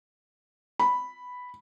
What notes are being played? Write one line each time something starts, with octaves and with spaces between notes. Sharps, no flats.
B5